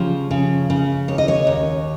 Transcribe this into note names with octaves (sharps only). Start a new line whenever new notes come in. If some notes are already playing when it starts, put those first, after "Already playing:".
Already playing: C#3 F3 G4
C#3
C#3
D#2 C#5
D#5
C#5
D#2